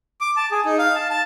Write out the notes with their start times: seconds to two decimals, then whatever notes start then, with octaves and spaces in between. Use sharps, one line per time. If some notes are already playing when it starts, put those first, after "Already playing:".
0.21 D6
0.36 A5
0.51 G#4
0.65 D#4
0.79 F5
0.95 A5
1.10 A5